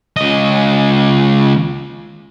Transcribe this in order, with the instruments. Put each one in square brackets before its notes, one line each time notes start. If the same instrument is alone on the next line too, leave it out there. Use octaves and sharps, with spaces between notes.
[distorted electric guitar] C#2 D#5